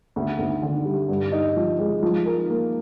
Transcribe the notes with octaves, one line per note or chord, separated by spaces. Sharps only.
D2
D2
D3
G3
G2
D#4
F3
G#3
F3
A#4
A#3